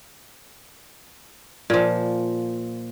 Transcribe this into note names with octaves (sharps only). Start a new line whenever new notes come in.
A#2 F3